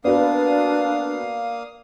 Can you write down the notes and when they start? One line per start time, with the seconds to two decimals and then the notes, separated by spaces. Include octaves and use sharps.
0.04 A#3 B3 D4 F#4 B4 D5 F5 D#6